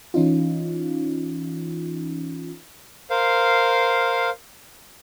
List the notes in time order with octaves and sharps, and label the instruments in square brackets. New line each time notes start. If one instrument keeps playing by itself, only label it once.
[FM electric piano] E3 C#4 D#4 F4
[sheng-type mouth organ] A#4 C5 F5